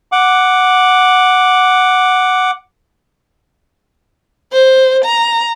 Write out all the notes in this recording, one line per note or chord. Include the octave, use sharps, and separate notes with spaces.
F#5 D6
C5
A#5